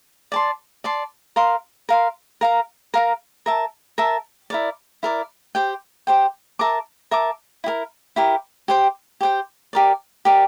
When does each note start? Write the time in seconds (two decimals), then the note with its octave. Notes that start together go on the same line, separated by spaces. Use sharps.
0.32 D5 A5 C6
0.84 D5 A5 C6
1.36 A#4 F5 C6
1.89 A#4 F5 C6
2.41 A#4 F5 A#5
2.94 A#4 F5 A#5
3.46 A#4 E5 A5
3.98 A#4 E5 A5
4.50 E4 A#4 D5
5.03 E4 A#4 D5
5.55 G4 C5 G5
6.07 G4 C5 G5
6.59 A#4 E5 A5 D6
7.11 A#4 E5 A5 D6
7.64 E4 G4 A#4
8.16 E4 G4 A#4
8.68 G4 C5 G5
9.21 G4 C5 G5
9.73 G4 A#4 D5
10.25 G4 A#4 D5